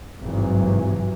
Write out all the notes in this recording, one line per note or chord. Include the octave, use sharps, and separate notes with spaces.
G#1 G2 C3 E3 F#3